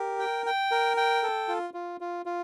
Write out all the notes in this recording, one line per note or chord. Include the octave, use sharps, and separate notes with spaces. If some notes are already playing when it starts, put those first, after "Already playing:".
Already playing: G4 A#4
G5
G5
A#4
G5
A4
F4
F4
F4
F4